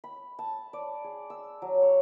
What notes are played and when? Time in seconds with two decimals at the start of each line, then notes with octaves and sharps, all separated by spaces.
0.04 B5
0.39 A5
0.73 D5
1.04 G#4
1.30 E6
1.62 F#3
1.82 C#5